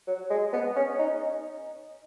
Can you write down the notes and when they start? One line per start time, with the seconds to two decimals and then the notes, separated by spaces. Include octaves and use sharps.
0.07 F#3
0.30 G#3
0.53 B3
0.76 C#4
0.99 D#4